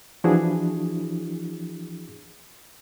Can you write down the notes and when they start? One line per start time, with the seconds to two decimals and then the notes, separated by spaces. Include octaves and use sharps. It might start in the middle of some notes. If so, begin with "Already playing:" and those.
0.24 E3 F3 D4 E4 F#4 G#4